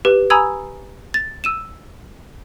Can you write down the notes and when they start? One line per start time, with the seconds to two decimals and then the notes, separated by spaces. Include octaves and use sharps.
0.05 G4 B4
0.30 G#5 A#5 B5 D#6 E6 G#6
1.14 A6
1.44 E6 D#7 E7